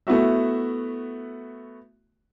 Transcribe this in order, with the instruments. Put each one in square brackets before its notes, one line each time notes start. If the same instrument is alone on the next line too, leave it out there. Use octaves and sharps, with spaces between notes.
[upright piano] A3 B3 E4 F#4 E5